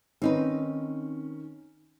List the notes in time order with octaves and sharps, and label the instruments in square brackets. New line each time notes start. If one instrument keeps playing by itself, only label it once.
[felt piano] D#3 C#4 [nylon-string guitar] C4 D#4 B4